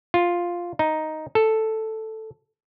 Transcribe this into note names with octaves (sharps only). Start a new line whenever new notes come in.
F4
D#4
A4